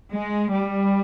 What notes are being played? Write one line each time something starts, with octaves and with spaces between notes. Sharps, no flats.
G#3
G3